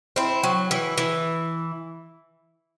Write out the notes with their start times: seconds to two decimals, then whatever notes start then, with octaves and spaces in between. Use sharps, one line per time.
0.16 C4 E4
0.43 F#3
0.71 E3
0.98 E3